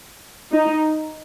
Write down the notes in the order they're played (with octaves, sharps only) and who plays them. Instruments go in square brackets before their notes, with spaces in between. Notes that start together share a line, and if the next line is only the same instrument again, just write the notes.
[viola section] D#4